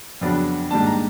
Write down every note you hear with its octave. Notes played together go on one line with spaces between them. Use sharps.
F2 C#3 F#3 B3 D4
G#2 D#3 G3 A#3 D4 A5
A#5